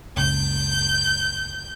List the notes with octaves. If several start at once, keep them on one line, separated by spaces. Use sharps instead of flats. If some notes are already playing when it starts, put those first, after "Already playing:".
F#1 C#2 G6